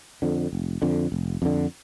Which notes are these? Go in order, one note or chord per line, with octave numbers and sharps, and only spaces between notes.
F2 D3
F1
F2 D3
F1
F2 D3